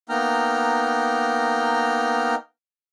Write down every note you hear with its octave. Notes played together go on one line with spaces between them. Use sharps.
A#3 B3 D#4 G5 A#5 F6